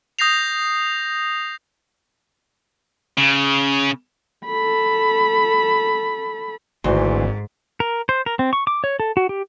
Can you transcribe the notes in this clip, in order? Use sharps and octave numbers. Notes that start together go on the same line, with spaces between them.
D#6 G6 A#6 C7 F7
C#3
A4 B5
G#1 D2 G#2 E3 F#4 C6
A#4
C5
A#4
C4
C#6
D6
C#5
A4
F#4
G4